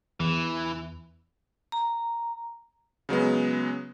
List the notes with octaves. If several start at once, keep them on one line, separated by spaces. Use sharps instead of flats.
E2 E3
A#5
C#3 F#3 G#3 B3